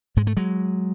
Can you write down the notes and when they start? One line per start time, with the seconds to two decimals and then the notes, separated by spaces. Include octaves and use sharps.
0.17 G#2 G#3
0.27 A3
0.37 F#3 G#3